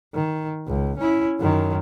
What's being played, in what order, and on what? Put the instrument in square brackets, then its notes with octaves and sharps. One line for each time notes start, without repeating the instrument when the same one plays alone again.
[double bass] D#3
C#2
C#4 E4
F#2 D#3